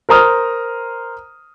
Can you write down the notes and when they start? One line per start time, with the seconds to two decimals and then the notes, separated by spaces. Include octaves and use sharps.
0.09 A#4 C5 A#5 D#6 F6